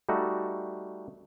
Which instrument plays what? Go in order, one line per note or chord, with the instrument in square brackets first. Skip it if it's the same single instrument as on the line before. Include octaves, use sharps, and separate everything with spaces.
[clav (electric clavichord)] G3 A3 D#4 F#4